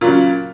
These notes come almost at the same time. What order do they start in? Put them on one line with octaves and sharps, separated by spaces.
A#2 F#3 C#3